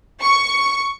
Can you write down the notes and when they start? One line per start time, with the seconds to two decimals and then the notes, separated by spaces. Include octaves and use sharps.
0.20 C#6